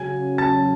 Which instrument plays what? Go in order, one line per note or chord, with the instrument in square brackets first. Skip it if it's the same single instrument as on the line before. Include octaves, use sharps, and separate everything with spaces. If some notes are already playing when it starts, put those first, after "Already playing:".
Already playing: [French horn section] C#3 F#3 C#4 [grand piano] G#5 G#6
[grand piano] A5 A6